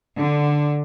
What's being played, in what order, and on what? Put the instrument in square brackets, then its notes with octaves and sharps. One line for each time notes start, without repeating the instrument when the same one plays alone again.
[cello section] D3